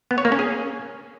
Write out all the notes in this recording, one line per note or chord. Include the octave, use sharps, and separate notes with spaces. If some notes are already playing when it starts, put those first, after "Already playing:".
B3
C#5
A#3
C#4
G#4